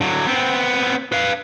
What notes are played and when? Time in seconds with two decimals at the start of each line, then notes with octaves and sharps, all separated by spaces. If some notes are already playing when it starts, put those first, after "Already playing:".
0.01 D3 F#3
0.27 B3 C4
1.12 B4 F5